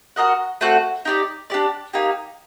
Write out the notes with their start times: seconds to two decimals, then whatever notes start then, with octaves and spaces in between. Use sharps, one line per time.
0.16 F#4 A#4 D#5 F#5
0.61 A3 C4 F#4
1.05 D#4 G4 D5
1.50 D4 G4 D5
1.93 A#3 D#4 G4